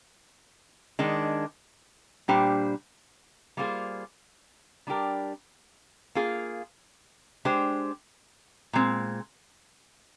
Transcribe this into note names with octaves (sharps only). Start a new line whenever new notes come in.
D#3 G#3 D4
A#2 G3 D4 G4 C5
G3 A#3 F4 G#4 C5
G3 D4 G4 A#4
A#3 F4 G#4
G#3 D4 G4 C5
A#2 G#3 C4